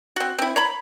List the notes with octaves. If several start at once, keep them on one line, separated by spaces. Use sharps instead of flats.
C4 F#4
C4 E4
C#5 A#5 B5